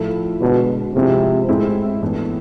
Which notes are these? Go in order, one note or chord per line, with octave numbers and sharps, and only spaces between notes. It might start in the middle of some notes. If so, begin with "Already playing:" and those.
Already playing: A2 F3 A3 E4
B2 D3 G#3 D4
C3 F3 G#3 C4 E4
A2 G#3 C4 E4
A2 E3 B3 D4